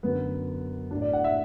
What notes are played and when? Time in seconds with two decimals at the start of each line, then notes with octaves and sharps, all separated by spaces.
0.03 F#2 D3 F#3 B3
0.91 A2 F#3 D4
1.02 D5
1.13 F#5
1.24 E5